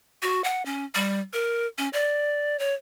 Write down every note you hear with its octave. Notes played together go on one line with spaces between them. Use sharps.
F#4
F#5
C#4
G3
A#4
C#4
D5
C#5